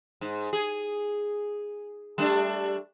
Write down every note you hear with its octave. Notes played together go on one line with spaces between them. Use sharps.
G#2
G#4
G3 A3 D4